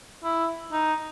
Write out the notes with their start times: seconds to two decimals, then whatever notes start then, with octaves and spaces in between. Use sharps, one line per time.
0.24 E4
0.72 D#4